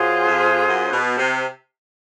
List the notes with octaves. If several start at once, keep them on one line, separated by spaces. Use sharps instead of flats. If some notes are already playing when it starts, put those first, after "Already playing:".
Already playing: F#2 F4 G#4 C5
F2
F#2
B2
C3